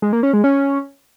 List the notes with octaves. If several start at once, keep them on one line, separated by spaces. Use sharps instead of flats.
G#3
A#3
C#4
G#3
C#4